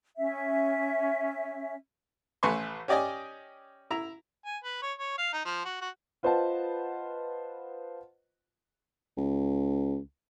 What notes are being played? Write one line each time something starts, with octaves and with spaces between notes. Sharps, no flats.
C#4 E5
A1 A3 B4 G#5 C6 C#6
C#4 G4 D5 D#5 G#5
E4 A#5
G#5
B4
C#5
C#5
F5
D#4
F3
F#4
F#4
F4 B4 C5 D#5 F#5 A5
C#2